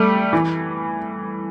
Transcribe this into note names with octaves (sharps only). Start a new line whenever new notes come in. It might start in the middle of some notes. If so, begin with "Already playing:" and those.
Already playing: G3 A3
E3